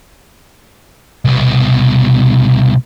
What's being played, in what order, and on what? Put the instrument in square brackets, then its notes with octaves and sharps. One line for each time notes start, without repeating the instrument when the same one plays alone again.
[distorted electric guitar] C2 B2